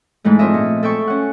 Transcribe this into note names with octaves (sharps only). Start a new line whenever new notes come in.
G#2 E3 G#3 A3
F3 C4 D4 A#4 D#5 E5
A#2
A4 E5 G5 C#6
C#4 F#5